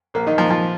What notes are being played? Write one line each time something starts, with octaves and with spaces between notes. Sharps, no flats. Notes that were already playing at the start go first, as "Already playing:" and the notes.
A#1 A#3
D#3 D#4
A#2 F3 F4
F3 F4